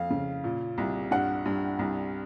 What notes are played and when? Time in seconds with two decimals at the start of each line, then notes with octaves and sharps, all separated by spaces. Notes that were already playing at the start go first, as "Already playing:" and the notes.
Already playing: F2 F5
0.10 C#3
0.44 A#2
0.78 C2
1.11 G2 F#5
1.45 G2
1.79 C2